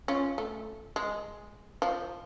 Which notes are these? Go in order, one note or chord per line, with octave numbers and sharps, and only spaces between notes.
C#4 F4
A3
G#3
F3